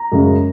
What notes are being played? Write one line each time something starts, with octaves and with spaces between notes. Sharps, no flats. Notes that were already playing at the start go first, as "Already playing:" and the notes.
Already playing: A#5
F#2 C#3 G#3